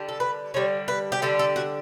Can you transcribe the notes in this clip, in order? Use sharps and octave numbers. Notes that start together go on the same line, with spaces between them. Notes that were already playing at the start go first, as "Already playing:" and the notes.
Already playing: D3 G3 D4
A4
B4
D3 G3 D4 C#5
B4
G4
D3 G3 D4 A4
A4
F#4